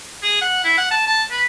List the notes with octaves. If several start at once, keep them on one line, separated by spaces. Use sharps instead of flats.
G#4
F#5
E4
F#5
A5
A5
B4